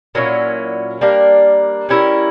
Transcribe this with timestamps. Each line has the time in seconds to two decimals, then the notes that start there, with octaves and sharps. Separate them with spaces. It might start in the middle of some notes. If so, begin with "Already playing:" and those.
0.15 A#2 F#3 C#4 E4
1.01 G3 A#3 D4 A#4
1.89 G3 C#4 E4 A#4